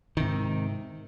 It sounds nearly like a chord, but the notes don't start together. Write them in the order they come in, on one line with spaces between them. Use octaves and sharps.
D#3 C3 G#2